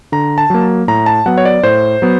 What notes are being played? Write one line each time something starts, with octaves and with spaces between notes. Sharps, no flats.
D3 A#5
A5
F#3 A#3
A2 A#5
A5
F#3 B3 F#5
C#5
D5
A2 C5
F#3 B3